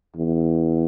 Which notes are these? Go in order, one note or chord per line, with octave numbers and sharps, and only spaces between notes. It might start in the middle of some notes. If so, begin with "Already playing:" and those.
E2